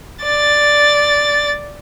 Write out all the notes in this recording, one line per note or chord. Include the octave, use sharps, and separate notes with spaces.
D5 A6